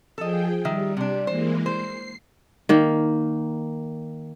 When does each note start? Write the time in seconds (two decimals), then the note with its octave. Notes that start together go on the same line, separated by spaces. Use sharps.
0.18 F3 G#4 A4 D#5 G5
0.65 D#3 G3 E5
0.97 C3 D4
1.27 E3 G#3 A#3 C5
1.66 C5 C7
2.69 D#3 A#3